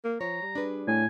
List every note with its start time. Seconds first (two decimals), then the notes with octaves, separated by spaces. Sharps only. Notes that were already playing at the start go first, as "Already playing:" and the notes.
0.05 A#3
0.21 F3 C#5 A#5
0.42 G3
0.55 D4 G#4 B4
0.88 A2 G#5